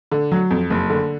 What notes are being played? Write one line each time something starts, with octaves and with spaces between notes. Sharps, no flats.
D3
F#3
F2
F#1
D3